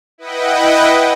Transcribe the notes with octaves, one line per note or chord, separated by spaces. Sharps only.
E4 B4 D#5 F#5 G5